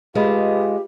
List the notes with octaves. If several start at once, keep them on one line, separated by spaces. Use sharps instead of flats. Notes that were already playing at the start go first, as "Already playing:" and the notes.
G#3 F4 G4 B4 D#5 B5